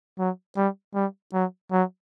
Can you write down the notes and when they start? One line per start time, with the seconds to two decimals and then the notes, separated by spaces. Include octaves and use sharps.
0.18 F#3
0.56 G3
0.94 G3
1.33 F#3
1.71 F#3